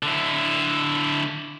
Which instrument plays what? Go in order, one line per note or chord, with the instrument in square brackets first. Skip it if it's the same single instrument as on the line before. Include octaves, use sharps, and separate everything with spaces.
[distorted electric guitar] D3 E4